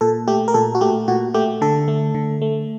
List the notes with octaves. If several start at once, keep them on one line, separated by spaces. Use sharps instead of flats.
A#2 A4
A3 G4
A#4
A#2 A4
F#4
A3 G4
A#2 F#4
A3 G4
D3 A4
A3
D3
A3